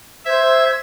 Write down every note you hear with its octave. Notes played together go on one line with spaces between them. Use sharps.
C5 E5 G#6